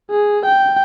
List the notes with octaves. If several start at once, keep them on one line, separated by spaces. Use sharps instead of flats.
G#4
G5